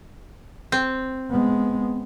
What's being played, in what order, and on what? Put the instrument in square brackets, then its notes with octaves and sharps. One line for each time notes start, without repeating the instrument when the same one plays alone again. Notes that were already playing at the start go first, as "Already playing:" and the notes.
[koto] C4
[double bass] G#3 B3